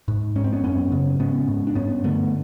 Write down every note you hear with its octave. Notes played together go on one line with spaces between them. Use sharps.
G#2
G#2 C#4
C4
B3 C#4
F#2 B3 C#4
C#3
G#2 B3 C#4
G#2
D4
G2 B3 C#4
D3 A3 B3